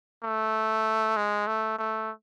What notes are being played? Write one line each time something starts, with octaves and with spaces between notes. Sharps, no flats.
A3
G#3
A3
A3